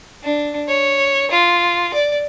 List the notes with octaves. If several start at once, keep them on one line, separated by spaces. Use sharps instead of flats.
D4
C#5
F4
D5